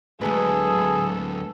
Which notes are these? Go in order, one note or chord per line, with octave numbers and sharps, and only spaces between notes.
D2 F#3 G#3 G#4 A4 B4